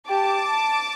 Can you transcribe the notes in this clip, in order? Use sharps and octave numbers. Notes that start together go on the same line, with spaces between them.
G4 A5 D6